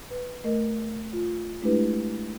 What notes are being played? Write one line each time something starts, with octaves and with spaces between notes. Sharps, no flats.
B4
A3 A#4 D#5
F4
G#3 A3 D4 E4 G4 B4